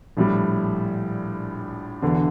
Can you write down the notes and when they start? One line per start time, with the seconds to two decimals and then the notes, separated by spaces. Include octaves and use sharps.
0.17 A#1 A2 G3
2.02 E1 E2 D3